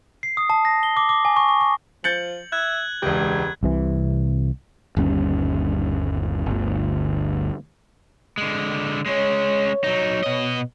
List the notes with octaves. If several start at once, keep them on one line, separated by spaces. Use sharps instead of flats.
C7
D#6
A5
A#6
G7
D6
D6
G#5
C#6
C#6
C#6
F3 G6 A6 C#7 F#7
E5 F#6 G#6
E1 C#2 G4
C2 C3 E3
G1 D#2 G3 C#4
G1 D2
D3 G#3
G#3 C#4 C#5
F#3 D#4
B2 D#5